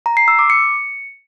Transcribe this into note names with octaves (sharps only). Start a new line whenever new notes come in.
A#5
C7
E6
D6
C#7